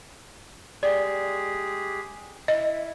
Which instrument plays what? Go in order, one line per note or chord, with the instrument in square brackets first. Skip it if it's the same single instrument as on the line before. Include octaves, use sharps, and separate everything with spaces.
[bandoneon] G#3 G4 G#4 [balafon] D5
[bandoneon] E4 [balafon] D#5